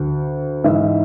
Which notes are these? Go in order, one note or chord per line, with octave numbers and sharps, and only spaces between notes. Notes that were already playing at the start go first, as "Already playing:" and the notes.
Already playing: D2
G#2 E3 E5